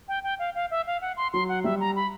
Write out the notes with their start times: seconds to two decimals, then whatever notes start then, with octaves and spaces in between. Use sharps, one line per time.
0.08 G5
0.24 G5
0.39 F5
0.55 F5
0.71 E5
0.87 F5
1.02 F#5
1.17 C6
1.33 F#3 C6
1.49 F#5
1.64 G3 E5
1.80 A#5
1.96 B5